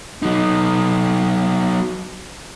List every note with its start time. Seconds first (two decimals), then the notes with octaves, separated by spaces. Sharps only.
0.22 F#3 D#4